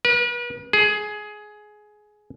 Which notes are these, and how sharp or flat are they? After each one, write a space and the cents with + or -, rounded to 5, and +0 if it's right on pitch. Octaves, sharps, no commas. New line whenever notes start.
B4 -40
G#4 +15